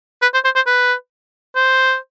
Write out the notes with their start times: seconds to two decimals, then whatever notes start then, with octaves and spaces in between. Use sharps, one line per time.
0.22 B4
0.34 C5
0.45 C5
0.55 C5
0.67 B4
1.56 C5